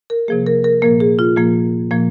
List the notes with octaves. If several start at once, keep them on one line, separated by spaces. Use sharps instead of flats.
A#4
C3 F3 A#3 G#4
A#4
A#4
A#2 F3 A#3 A#4
G#4
F4
A#2 F3 A#3
A#2 F3 A#3